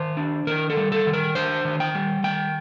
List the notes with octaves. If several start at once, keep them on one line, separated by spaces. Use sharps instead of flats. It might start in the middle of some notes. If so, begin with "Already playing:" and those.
Already playing: D#3 C5
D4
D#3 A#4
A4
G3
A4
D#3
A#4
D4 C5
D#3
G5
G3
D#3 G5